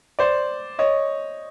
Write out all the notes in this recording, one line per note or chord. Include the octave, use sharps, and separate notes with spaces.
C5 D5
C#5 D#5